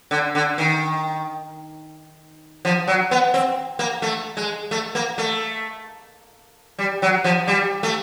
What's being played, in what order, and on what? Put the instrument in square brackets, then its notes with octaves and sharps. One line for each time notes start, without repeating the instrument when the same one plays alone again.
[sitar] D3
D3
D#3
F3
F#3
B3
C4
A#3
A3
G#3
A3
A#3
A3
G3
F#3
F3
G3
A3